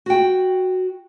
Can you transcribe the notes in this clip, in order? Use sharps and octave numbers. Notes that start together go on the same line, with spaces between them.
F#4 G5